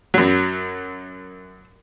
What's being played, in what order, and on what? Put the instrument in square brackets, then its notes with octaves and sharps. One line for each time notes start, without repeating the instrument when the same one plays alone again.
[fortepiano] F#2 F#3